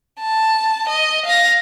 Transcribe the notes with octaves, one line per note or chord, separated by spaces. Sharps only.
A5
D#5
F5 A#6